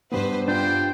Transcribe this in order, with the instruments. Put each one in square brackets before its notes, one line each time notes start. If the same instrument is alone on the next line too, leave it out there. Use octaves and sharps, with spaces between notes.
[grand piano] G2 B3 [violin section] B4 C5
[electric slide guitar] D4 F4 G4 [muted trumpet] C5 [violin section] G5